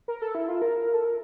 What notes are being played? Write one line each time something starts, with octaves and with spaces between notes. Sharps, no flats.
A#4
A4
E4
F4
A#4
A4
A#4